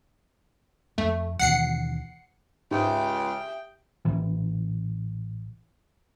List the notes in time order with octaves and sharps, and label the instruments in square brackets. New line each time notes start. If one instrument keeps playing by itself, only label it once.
[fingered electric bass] F2 [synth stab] A3
[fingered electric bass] D#2 B2 E3 [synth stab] F#5 C7 C#7
[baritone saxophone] C#2 [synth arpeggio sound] G#2 [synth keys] G4 E5 D#6 [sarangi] G5
[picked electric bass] A1 A#2 E3